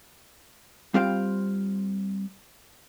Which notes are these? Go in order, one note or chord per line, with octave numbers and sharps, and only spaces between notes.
G3 C4 F4 C5 F5 G5